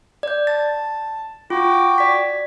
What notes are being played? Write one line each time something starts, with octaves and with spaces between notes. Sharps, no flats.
D5 G6
A5 A6
F4 F#4 G5 D6
D5 B6